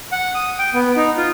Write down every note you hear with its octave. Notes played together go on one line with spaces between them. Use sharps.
F#5
D#6
G5
B3
D#4
F4